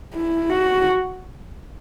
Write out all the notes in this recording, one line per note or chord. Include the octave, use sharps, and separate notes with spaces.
E4
F#4